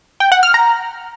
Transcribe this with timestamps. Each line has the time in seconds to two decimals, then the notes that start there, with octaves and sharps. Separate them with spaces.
0.20 G5
0.32 F#5
0.43 F6
0.54 A#5